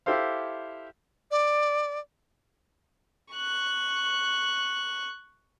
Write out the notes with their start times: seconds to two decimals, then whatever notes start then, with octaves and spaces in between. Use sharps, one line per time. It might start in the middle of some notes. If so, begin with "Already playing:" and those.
0.06 E4 G4 A4 C5 F5
1.31 D5
3.33 C#6 F#6